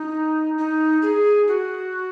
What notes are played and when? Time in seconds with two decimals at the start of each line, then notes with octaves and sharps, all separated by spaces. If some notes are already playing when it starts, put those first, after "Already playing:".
Already playing: D#4
0.58 D#4
1.02 G#4
1.48 F#4